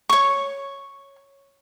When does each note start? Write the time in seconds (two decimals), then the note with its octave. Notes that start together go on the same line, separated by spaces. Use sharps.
0.09 C#5 C#6